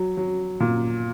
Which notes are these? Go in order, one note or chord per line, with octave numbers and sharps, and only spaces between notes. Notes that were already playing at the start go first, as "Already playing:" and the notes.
Already playing: F#3
F#3
A#2